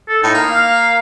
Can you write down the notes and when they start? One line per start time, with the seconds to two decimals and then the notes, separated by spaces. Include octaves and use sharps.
0.08 A4
0.23 A2 D#4
0.35 A#3
0.49 F5